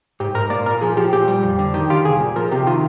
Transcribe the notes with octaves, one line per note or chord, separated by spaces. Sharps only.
G#2 G4
G#2 A#4
A#3 D5
A#2 A#4
F3 G#4
F3 G4
A#2 G4
G3
F2
D3
D#3 G4
F4 G4
C2 G#4
A#2
F3 A#4
C3 G4
D#3 F4